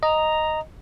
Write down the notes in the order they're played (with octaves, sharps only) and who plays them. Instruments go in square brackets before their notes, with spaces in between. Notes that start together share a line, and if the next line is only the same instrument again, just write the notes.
[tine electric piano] D#5 [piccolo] A#5